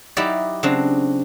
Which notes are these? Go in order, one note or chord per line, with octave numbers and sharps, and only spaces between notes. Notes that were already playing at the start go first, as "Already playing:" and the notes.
F#3 D#4 E4 G4 D5
C#3 F#3 C4 D4